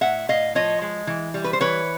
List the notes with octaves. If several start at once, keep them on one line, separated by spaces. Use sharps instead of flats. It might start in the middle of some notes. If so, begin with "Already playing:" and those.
A2 E5 F#5
A2 D#5 F5
F3 C#5 D#5
G#3
E3
G3
B4
C5
E3 B4 C#5